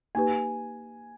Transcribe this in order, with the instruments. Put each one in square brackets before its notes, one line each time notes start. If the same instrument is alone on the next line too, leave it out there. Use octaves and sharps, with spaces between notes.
[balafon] A#3 D#4 G4 B4 [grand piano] G#5